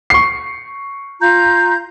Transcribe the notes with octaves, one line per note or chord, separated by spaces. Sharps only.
C#6 C7
F4 A#5 G6